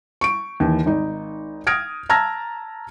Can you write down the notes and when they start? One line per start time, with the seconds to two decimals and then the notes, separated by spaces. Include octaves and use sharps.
0.21 C#6 D7
0.60 D#2 E3
0.86 G#1 D#4
1.67 D#6 F6 G#6 A#6 D7
2.10 A5 A#5 E6 F6 G#6 A#6